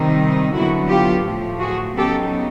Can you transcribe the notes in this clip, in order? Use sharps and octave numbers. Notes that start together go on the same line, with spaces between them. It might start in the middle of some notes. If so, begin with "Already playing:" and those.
Already playing: C3 D#3 G3 C4 D#4
D3 F#3 B3 E4 F#4
F4 G4
A2 F3 A3
F#4 G#4
C#3 F#3 B3 D#4 G4 A4